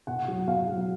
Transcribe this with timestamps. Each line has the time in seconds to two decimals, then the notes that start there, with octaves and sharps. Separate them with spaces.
0.07 B2 F#5
0.28 F#3
0.47 B2 F5
0.68 F#3